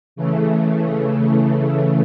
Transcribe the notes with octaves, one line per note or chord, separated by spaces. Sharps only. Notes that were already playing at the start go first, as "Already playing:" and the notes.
C#3 E3 A3